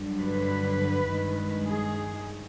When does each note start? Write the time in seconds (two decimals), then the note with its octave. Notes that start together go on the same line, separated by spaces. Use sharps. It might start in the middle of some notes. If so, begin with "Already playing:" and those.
Already playing: G2 D3 F#3
0.22 B4
1.08 G2 D#3 G#3
1.67 G#4